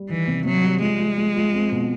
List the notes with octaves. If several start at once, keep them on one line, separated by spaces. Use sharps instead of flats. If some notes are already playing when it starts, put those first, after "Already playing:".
Already playing: G3
D#3 E3
C3
C3 F#3
G3
F3 G#3
F3
F3
F3
C4
B2